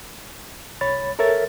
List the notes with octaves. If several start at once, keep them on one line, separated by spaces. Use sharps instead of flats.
C2 C#5 B5 A6
A4 A#4 C#5 E5 A6